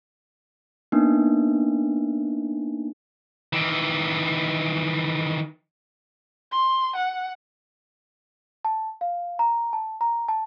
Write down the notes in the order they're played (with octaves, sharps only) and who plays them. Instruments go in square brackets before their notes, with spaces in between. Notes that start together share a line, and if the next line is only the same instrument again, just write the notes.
[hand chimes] A#3 B3 D4 D#4
[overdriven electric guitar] D#3 E3
[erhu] C6
F#5
[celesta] A5
F5
A#5
A5
A#5
A5